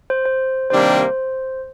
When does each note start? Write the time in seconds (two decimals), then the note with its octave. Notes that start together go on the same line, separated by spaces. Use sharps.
0.10 C5
0.26 C5
0.70 C3 D#3 G3 A#3 D4 C5